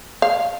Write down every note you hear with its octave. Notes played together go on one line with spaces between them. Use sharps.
F5